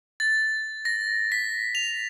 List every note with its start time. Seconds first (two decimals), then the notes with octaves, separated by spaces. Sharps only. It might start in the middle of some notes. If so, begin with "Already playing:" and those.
0.20 A6
0.85 A#6
1.32 B6
1.75 F7